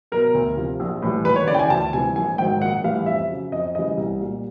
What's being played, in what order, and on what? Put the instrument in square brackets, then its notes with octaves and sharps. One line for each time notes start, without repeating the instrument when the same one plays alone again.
[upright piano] B2 F#3 A#4
D2
C3 F3
A#1
A2 E3 G3
D#2 B4
C#5
C#3 E3 D5
G5
G#5
D2 A5
C3 E3 G3 G#5
A#1 G#5
G#2 D#3 F#3 G5
A#1 F#5
A2 E3 G3 F5
F2 E5
C#3 F#3
F2 D#5
C#3 E3 G3 D#5
C2
A#2 G3